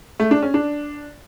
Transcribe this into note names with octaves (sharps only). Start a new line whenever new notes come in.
A3
D4
C#4
D4